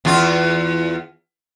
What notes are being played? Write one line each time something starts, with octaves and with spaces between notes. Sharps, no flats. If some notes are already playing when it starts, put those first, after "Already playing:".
E2 F4